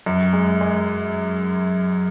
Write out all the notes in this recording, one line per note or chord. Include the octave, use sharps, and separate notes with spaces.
F#2
G#3
G#3